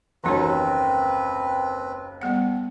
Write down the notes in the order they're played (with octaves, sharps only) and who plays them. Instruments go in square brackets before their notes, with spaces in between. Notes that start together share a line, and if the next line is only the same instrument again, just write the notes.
[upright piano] F#1 D#2 A#5 [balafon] E3 F#4 C#5 [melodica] C4 B4
[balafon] G3 B3 F#5